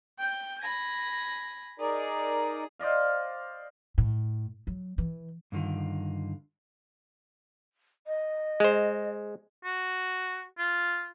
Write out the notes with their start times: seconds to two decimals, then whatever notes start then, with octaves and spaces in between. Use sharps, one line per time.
0.17 G5 G6
0.62 G#5 B5 A#6
1.80 D#4 G#4 A#4 D5
2.79 C5 D5 D#5 F5
3.98 A2
4.67 F#3
4.98 E3
5.52 G2 D3 D#3 F4
8.07 D#5
8.60 G#3 C5
9.64 F#4
10.58 F4